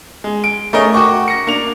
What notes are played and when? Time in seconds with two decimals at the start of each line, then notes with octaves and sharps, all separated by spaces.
0.24 G#3
0.44 D7
0.73 A3 G#4 A#4 C#5 D#5
0.93 F#4 G5 C#6 D6
1.28 A#6 C#7
1.47 A#3 D4 F7